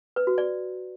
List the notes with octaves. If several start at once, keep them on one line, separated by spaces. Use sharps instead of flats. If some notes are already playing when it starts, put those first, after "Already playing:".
B4
F#4
D5